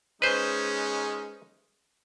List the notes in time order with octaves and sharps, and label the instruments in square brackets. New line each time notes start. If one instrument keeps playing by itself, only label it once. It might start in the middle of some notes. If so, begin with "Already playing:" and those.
[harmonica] G#3 C#4 D#4 [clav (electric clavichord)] B4 C5